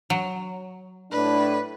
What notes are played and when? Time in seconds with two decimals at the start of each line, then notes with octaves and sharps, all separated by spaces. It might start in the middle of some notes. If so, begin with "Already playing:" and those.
0.10 F#3
1.12 A2 D4 B4